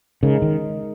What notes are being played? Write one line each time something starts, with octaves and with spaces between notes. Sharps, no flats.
C#3 G#3 D#4 A#4
D#3